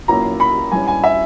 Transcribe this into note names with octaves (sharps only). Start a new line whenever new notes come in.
B1 A#2 A#3 C#4 E4 A#5
B5
G2 G3 C#4 E4 G#5
G#5
E5